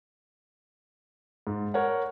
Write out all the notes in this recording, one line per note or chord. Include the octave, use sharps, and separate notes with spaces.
G#2
A#4 C#5 F#5